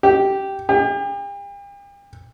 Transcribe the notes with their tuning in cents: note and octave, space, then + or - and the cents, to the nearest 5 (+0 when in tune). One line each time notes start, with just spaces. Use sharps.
G4 -10
G4 +40